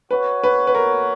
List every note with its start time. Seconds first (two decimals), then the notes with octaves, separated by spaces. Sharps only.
0.11 F#4 B4 C#5 F#5
0.44 B4
0.67 B4
0.75 A#4